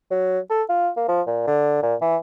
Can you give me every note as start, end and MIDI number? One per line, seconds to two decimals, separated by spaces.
0.11 0.39 54
0.50 0.63 69
0.69 0.90 65
0.97 1.06 58
1.08 1.21 53
1.27 1.46 46
1.47 1.79 50
1.82 1.95 46
2.01 2.16 52